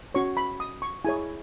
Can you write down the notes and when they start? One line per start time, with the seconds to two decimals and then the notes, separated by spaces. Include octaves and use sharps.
0.15 C#4 F#4 C#5 C#6
0.37 B5
0.60 D#6
0.82 C#6
1.05 E4 G#4 C#5 G#5